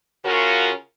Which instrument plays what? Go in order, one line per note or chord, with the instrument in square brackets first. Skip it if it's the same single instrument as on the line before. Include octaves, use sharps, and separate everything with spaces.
[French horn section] C#3 C#4 F4 F#4 A#4